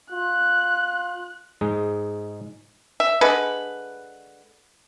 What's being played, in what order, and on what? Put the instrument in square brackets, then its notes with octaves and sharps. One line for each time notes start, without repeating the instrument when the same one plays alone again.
[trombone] F4 [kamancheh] F#6
[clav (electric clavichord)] G#2 G#3 D#4
[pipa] E5
D3 G#3 B4